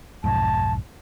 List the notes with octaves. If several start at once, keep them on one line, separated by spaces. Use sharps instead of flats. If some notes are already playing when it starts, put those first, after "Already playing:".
B1 F2 G#2 A5